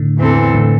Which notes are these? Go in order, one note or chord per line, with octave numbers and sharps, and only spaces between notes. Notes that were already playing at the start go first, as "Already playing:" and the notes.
Already playing: A2 D3
E2 E3 C4 A4
A2 D3